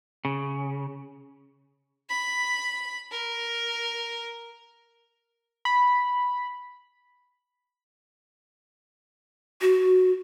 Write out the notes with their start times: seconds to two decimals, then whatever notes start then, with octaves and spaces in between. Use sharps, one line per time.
0.25 C#3
2.09 B5
3.11 A#4
5.65 B5
9.61 F#4